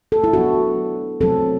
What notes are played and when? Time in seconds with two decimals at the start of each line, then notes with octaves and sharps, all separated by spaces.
0.12 A4
0.24 E4
0.33 F#3 B3 D4 F#4
1.21 F#3 C4 A4